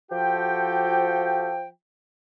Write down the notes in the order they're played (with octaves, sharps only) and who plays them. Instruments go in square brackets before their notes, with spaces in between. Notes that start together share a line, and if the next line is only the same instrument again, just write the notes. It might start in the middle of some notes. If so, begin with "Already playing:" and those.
[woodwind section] F3 G5 [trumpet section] F#4 G4 A4